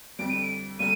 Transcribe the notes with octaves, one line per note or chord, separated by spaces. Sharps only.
F2 D3 G3 D7
D#7
D7
D3 G3 A#3 D#7